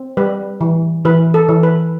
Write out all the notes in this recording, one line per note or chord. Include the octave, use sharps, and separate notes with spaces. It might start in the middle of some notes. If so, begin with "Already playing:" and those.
Already playing: C4
G3 B4
E3
E3 B4
A4
E3
B4